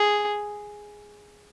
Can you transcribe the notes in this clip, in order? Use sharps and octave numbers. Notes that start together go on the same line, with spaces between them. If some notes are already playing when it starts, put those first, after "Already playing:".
Already playing: G#4